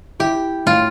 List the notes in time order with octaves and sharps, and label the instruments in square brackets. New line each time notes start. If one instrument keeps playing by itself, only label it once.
[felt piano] E4 [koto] G4
[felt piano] A2 [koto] F4